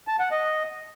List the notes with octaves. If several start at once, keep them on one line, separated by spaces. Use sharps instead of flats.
A5
F#5
D#5